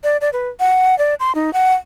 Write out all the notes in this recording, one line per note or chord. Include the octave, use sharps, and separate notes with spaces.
D5
D5
B4
F#5
D5
C6
D#4
F#5